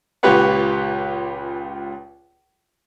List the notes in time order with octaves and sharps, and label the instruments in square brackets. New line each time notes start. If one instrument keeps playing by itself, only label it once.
[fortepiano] C#2 A#2 G4 B4 C#5 F#5